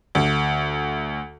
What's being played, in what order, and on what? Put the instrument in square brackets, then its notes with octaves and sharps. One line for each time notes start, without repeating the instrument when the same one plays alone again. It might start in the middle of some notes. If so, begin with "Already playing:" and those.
[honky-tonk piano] D2